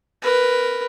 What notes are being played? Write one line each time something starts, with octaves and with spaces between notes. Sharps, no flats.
A#4 B4